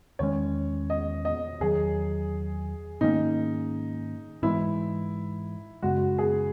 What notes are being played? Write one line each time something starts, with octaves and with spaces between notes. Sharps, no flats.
E2 D#3 G#3 C#4 C#5
D#5
D#5
E2 D#3 F#3 G#4
G#2 D#3 A#3 C#4 D#4
G#2 E3 G#3 E4
F#2 C#3 G#3 F#4
G#4